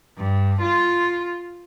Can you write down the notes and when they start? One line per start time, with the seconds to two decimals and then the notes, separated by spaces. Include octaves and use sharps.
0.17 G2
0.61 F4